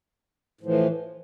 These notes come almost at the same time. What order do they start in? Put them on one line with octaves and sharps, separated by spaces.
A2 F3 E3